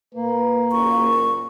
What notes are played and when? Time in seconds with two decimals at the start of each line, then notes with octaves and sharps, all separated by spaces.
0.15 A#2 A#3 A#4 B4
0.72 F#1 A#2 C#6